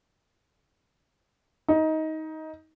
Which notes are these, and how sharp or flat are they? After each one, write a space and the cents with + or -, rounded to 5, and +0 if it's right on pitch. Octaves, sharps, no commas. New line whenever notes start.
D#4 +20